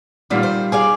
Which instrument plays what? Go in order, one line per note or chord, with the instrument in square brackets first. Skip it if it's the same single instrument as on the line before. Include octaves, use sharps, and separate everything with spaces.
[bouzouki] A#2 D3 [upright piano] D#3 G3 F4
[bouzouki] C5
G#4 D5 F5